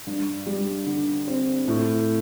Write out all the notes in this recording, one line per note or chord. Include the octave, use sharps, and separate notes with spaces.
G2
G3
D3
C4
A2